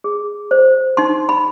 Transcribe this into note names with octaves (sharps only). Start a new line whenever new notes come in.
G#4
C5
D#4 C6
B5